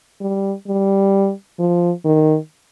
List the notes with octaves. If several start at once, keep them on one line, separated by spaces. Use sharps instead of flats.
G3
G3
F3
D#3